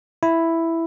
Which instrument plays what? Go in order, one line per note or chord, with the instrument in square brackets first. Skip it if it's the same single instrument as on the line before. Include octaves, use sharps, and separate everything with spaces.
[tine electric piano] E4